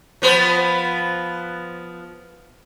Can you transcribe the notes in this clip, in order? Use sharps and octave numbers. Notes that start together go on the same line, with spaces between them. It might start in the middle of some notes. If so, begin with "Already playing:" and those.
F3 B3 C5